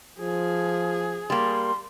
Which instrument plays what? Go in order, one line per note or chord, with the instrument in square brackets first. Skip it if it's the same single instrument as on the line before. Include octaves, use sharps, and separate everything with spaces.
[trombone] F3 [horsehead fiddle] G#4
[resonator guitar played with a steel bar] G3 A#3 [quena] C6